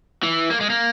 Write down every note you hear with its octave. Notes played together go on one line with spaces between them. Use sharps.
E3
A#3
G#3
A#3